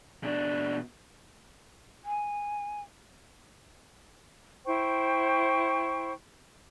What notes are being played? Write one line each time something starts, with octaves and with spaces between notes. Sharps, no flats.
B2 D4
G#5
E4 C5 G5 C#6